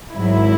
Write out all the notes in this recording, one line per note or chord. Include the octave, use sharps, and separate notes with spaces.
G#1 G#2 F#3 E4